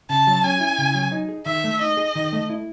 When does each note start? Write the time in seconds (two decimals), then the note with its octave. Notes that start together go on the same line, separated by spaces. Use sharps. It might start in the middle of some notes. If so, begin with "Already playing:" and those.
0.10 C#3 A5
0.27 F#3
0.44 C#4 G#5
0.60 E4
0.78 C#3
0.94 F#3
1.12 D#4
1.29 G#4
1.46 D#3 E5
1.64 A3
1.81 D#4 D#5
1.97 G#4
2.15 D#3
2.33 A3
2.50 E4